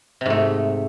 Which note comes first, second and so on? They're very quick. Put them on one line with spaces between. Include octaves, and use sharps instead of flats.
C3 G#2 A3